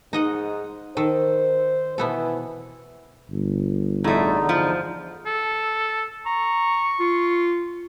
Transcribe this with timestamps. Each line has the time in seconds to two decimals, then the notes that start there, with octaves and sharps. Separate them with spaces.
0.13 G#2 D#4 D#5 F#5
0.97 D#3 A4 C5
1.98 B2 E3 B3 A4
3.30 G1
4.04 E2 A2 D3 A3 D#4
4.49 F3
5.26 A4
6.26 A#5 C#6
7.00 F4